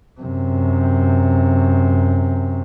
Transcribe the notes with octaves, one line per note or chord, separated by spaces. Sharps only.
F#2 C3